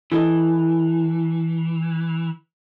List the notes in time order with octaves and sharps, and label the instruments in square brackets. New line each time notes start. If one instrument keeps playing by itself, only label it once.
[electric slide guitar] E3 [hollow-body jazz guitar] E4 A4 D#5